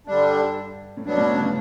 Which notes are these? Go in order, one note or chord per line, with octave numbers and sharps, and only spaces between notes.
G2 D3 G3 D4
A2
G2 B2 F#3 B3 D4
A2
C#3
C#3